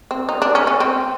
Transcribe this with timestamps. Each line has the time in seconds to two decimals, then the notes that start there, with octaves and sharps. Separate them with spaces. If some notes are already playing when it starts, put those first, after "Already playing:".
0.11 C4
0.29 D#4
0.42 D4
0.55 C#4
0.67 C#4
0.80 C4